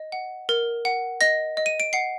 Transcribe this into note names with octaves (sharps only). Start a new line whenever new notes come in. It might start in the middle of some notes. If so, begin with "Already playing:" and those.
Already playing: D#5
F#5
A#4
F#5
D#5 A#6
D#5
D#7
D7
F#5 C7